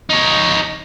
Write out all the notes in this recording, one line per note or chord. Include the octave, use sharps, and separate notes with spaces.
D#4 C#5